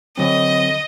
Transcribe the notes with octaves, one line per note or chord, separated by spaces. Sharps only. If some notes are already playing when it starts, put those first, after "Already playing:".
D3 F#3 C4 D#5